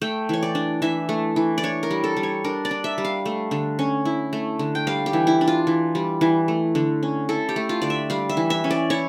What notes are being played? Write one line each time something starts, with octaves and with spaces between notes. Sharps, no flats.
A3 G5
E3 C#5
D5
D4
E3 E5
A3
E3
D5
D4 C#5
A#4
G3
A4
G3
C#5
D4 A#4
D5
D4
E5
G3
F5
A3
D3
C#4
E4
A3
D3
G5
G3 F5
G4
E3
E4
D4
F4
E3
G3
E3
A3
D3
C#4
E4 A4
G4
A3
F4
D3 D5
E5
G3 F5
E5
E3
E5
C#4
D5
E4 C#5